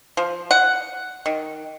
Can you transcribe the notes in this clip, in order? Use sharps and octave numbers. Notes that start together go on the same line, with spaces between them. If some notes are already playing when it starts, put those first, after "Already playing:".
F3
F#5
D#3